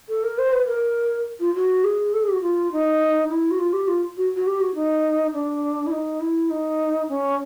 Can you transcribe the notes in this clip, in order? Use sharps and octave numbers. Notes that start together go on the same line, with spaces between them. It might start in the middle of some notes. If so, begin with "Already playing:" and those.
A4
A#4
C5
B4
A#4
F4
F#4
G#4
A4
G#4
G4
F#4
F4
D#4
E4
F#4
F4
G4
F4
F#4
F#4
G4
F#4
D#4
D4
E4
D#4
E4
D#4
C#4